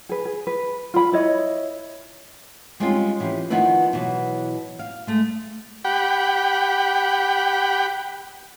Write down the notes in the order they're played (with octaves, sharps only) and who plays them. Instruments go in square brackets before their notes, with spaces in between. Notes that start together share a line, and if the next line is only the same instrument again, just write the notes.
[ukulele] G#4 B4
G#4
B4
F4 B5
E4 C#5 D#5
[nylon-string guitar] G3 G#3 C4 C#4 D#4 F4
E3 F3 C#4 G4
D#3 F3 B3 D#4 E4 B4
B2 E3 F#3
F5
G#3 A3
[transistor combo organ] G4 F#5 G5 B5